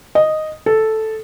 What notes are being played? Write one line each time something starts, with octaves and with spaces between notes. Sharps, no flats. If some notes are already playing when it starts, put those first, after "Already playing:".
D#5
A4